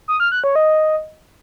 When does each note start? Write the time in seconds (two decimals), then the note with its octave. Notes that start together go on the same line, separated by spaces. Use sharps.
0.08 D#6
0.20 F6
0.32 F#6
0.44 C#5
0.56 D#5